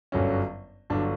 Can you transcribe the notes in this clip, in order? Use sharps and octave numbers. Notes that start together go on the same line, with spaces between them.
G1 F#2 D3 F#3 C#4
G1 D3 F#3 D4